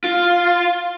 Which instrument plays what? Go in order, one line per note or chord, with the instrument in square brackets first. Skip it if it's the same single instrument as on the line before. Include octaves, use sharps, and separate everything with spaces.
[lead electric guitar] F4